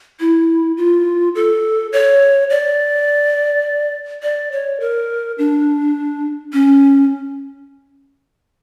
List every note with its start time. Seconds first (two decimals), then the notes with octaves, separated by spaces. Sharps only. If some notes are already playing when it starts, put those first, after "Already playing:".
0.20 E4
0.77 F4
1.35 A4
1.92 C#5
2.50 D5
4.23 D5
4.52 C#5
4.80 A#4
5.38 D4
6.53 C#4